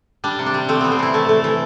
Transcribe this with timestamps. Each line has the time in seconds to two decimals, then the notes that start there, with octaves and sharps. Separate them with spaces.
0.24 G3 D4
0.39 C3
0.46 D4
0.54 G3
0.69 A3 C4
0.81 E3 B3
0.92 C4
0.99 C3 E4
1.14 A3
1.29 A3
1.44 E3